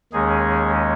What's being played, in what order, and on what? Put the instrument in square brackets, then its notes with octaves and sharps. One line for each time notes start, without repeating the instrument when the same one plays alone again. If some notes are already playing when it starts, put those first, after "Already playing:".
[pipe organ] D#2 D#3 G#3 C#4 G#4